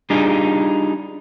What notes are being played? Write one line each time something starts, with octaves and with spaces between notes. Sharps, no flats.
G3 D4 D#4 F4 G#4